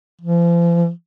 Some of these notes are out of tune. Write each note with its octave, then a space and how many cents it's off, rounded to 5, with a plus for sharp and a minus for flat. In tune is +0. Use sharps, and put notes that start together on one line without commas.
F3 -40